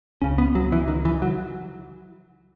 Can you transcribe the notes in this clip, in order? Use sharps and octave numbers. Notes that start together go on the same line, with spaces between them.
C#2 C#3 C#4
B3
F#3
E3
D#3
E3
F#3